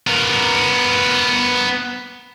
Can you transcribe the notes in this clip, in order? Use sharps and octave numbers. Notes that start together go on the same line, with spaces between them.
B3 A#4